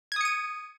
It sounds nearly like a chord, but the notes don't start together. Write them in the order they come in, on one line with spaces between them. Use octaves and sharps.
G#6 D#6 C#7 D#7